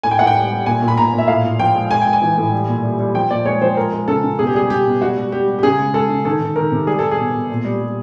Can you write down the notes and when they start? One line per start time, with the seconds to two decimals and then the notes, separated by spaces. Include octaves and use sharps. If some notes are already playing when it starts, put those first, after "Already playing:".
0.03 A2 G#5
0.11 G5
0.19 A2 F#5
0.27 G5
0.35 G3
0.51 G3
0.66 A#2 G#5
0.82 A#2
0.88 B5
0.97 A#2 A#5
1.13 A#2
1.18 E5
1.28 A2 F5
1.44 A2
1.59 F3 G5
1.75 G#3
1.91 G#3 G#5
2.02 G#3 G5
2.13 G#5
2.22 E3
2.37 A2
2.53 G3
2.68 A#2
2.83 G3
2.99 G3
3.15 F3 G5
3.30 A#2 D5
3.45 G#3 C#5
3.61 F3 C5
3.77 G#3 A#4
3.93 G#3
4.08 C#3 A4
4.24 C#3
4.39 B2 G#4
4.47 G4
4.55 G3 G#4
4.70 G3 G4
4.85 B2
5.01 G3 F#4
5.17 G3
5.32 G3 G4
5.48 G3
5.59 G4
5.63 C#3 G#4
5.79 G#3
5.94 G#3 A4
6.09 C#3
6.25 D#3 A4
6.40 D#3
6.56 D#3 A#4
6.72 C3
6.87 G3 G#4
6.99 G3 A4
7.11 G#4
7.19 B2
7.34 B2
7.50 A#2
7.65 G3
7.81 G3